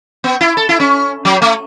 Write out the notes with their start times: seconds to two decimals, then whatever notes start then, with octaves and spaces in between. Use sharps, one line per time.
0.24 B3
0.41 E4
0.57 A4
0.69 E4
0.80 C#4
1.25 F#3
1.42 A3